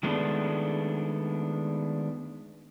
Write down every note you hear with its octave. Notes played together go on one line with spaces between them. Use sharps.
D#3 G#3 A3 B3 D4